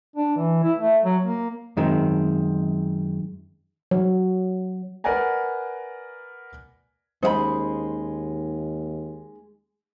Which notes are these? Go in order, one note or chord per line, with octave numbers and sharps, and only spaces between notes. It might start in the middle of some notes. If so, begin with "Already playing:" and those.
D4
E3
E4
A3
F#3
A#3
F#2 D#3 G#3 C4
F#3
A#4 B4 D5 F#5 G#5 A#5
D#2 G#3 C#4 D#4 C5 E5 B5